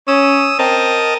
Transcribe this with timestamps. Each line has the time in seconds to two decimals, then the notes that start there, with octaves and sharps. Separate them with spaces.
0.08 C#4 D#6 E6
0.59 C4 A#4 D#5 A5